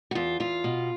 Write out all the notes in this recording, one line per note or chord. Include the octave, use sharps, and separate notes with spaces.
F#4
E2 F4
E2 F4
B2